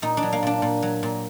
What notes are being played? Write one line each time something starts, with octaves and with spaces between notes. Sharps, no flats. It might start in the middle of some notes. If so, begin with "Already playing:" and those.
A#2 D#4
D4
F#3
A#3
A#2 D4
A#2
F#3
A#2